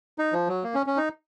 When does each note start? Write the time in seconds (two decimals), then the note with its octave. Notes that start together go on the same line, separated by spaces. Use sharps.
0.18 D#4
0.33 F3
0.48 F#3
0.63 A#3
0.74 C#4
0.86 C#4
0.97 D#4